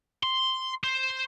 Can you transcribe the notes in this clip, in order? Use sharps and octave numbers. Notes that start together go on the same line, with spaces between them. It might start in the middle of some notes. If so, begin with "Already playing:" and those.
C6
C5